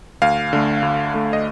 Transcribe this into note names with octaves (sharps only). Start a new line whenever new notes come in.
D2 F5
D3 A3
D2
D3 A3
D#5